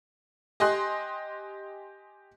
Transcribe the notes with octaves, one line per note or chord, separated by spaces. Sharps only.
G4 D#5 G#5 C6 F#6